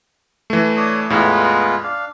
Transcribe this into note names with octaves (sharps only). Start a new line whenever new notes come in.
E3 A3
D4 C#5 D#6
E2 A2 G#3 B3 F4
D4 F5